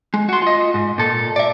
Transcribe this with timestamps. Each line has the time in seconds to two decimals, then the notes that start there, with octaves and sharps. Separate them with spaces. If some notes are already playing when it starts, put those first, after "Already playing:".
0.14 G#3
0.29 F#4 C6
0.42 F4 D#5
0.74 G#2
0.98 A#2 A4
1.36 D5 E5